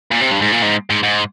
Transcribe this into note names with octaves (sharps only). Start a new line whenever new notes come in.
A#2
C3
G2
G#2
A#2
G#2
G#2
G#2